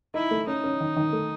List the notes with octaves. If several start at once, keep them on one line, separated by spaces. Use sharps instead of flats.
D#4 E4
A3
C#4 D#4
C#4
D#3
D#3
A3